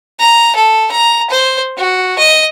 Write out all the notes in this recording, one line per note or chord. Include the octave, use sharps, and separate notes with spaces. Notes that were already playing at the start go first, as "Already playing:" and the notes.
A#5
A4
A#5
C5
F#4
D#5